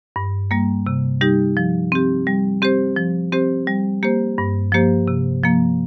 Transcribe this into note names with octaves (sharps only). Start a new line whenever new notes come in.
G2
G3 A#3
C3
G3 D#4 G4
F3
C4 G4
G3
C4 G4 C5
F3
C4 G4 C5
G3
A#3 G4 C5
G2
F3 A#3 G4 C5
C3
F3 A#3